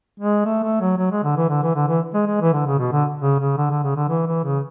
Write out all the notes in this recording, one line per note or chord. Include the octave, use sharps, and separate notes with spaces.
G#3
A3
A3
F#3
F#3
G#3
D3
E3
D3
E3
D3
E3
G#3
G#3
E3
D3
C#3
B2
D3
C#3
C#3
D3
D3
C#3
D3
E3
E3
C#3